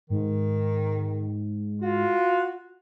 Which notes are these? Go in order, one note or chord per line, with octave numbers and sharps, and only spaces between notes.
G#2 D#3
F4 F#4